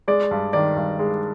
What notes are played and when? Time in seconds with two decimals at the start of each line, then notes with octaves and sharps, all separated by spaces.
0.08 G#3 D5
0.31 G2
0.53 D#3 D5
0.77 G2
0.99 G#3